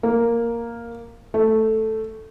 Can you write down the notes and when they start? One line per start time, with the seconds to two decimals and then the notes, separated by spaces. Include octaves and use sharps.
0.03 A#3
1.34 A3